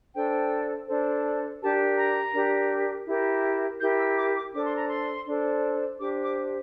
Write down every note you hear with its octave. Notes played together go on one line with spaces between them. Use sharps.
D4 A4 C5 G5
D4 A4 C5
D4 G4 A#4 A5
A#5
D4 G4 A#4
E4 G4 A#4
E4 G4 A#4 G6
E6
D6
D6
D4 A4 C5 D6
C6
A#5
C6
D4 A4 C5
D4 G4 C5 D6
D6